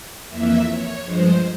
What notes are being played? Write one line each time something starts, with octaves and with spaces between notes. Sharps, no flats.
F2 E3 A#3 E5
C#5
G2 F3 G#3 C5